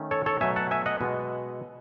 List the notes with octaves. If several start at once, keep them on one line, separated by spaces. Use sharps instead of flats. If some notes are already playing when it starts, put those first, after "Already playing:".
Already playing: D#3 A3 C#4
A4 C#5
A4 C#5
B2 F#3 A3 E5 G#5
F#5 A5
E5 G#5
D#5 F#5
B2 G#3 B3